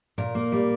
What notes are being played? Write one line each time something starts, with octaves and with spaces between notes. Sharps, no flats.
A#2 A#4
A#3
G3